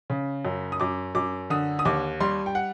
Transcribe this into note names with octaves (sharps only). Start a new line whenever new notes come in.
C#3
F#2
D#6
F#2 D6
F#2 D6
D3 D#6
D#6
D#2 D6
G3 C6
G5
F#5